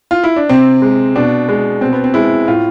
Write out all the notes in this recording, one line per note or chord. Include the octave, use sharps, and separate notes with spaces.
F4
E4
D4
C3 C4
G#3
B2 D4
G#3
B2 C4
B3
C4
G#3 E4
A2 F4